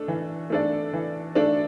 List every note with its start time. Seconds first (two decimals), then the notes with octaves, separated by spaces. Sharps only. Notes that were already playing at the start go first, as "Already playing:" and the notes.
Already playing: A3 D4 A4
0.08 E3
0.50 A3 D4 A4 D5
0.93 E3
1.35 A3 D4 A4 D5